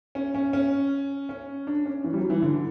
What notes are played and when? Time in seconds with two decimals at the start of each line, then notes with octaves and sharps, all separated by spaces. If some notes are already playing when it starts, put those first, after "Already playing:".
0.15 C#4
0.35 C#4
0.53 C#4
1.29 C#4
1.67 D4
1.86 C#4
2.04 E3
2.13 G3
2.18 F#3
2.30 E3
2.42 D3